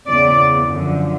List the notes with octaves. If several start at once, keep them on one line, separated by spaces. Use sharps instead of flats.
E2 C#3 E3 D5
F#2 D3 F3